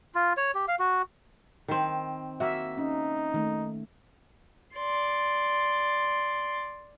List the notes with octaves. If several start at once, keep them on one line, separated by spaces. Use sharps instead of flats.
F4
C#5
G4
F5
F#4
D#3 C4
A#3 F#4 E5
C#4 D#4
D#3 A3
D5 C6